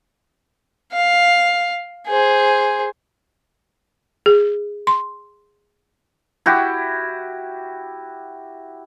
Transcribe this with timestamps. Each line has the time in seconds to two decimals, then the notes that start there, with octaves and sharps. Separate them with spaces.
0.93 F5
2.08 G#4 C5
4.26 G#4
4.87 C6
6.46 E4 F#4 G4